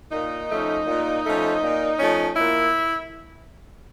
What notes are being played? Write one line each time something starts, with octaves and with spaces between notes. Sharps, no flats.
A#2 D#4
F3 A3 C#4
A#2
F3 A3 C#4
A#2
F3 A3 C#4
A#2 E4